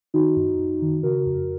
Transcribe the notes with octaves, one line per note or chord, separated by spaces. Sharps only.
D#3 D#4 F#4
F#2
F#2
D#3
C#3 F#4 A#4
F2